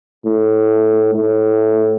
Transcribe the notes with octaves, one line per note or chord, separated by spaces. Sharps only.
A2
A2